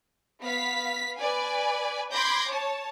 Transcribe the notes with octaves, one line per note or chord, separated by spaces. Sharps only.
B3 F5 B6
B4 D5 G#5
B5 C6 D6 G6 G#6 A#6
C#5 A5